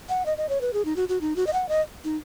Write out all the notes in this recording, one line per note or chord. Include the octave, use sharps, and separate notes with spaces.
F#5
D#5
D#5
C#5
B4
G#4
D#4
F#4
F#4
D#4
F#4
D#5
F#5
D#5
D#4